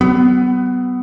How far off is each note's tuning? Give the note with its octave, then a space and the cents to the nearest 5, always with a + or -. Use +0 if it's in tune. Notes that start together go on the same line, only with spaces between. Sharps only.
F#3 +40 B3 +15